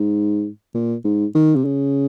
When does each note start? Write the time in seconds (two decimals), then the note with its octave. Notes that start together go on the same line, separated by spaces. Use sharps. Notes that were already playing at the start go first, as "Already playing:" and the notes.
Already playing: G#2
0.74 A#2
1.04 G#2
1.34 D#3
1.56 C3
1.64 C#3